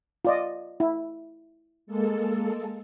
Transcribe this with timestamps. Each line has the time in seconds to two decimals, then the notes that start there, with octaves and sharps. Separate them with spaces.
0.25 F4 D5 D#5
0.80 E4
1.87 G#3 A#3 A4